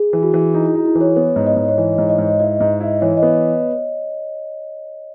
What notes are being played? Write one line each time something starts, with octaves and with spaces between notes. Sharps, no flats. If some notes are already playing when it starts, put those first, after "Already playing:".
Already playing: G#4
E3
F#4
E3
D#4 E4
E4
D#4
E4
E3
C#5
B3 C#5
G#2
D#5
G#2
C#5
E3 D#5
G#2
D#5
G#2
E4 D#5
G#2
E4
E3 C#5
D#5
B3